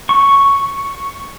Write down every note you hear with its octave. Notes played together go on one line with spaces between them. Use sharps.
C#6